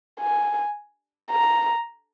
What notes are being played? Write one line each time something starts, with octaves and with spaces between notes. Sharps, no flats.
G#5
A#5